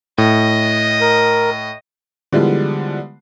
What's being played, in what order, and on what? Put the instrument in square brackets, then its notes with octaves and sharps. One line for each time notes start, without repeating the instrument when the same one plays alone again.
[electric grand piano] A2 [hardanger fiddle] D#5
[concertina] A#4
[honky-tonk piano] D3 E3 F3 G3 G#3 B3